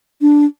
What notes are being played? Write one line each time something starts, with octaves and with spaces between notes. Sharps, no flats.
D4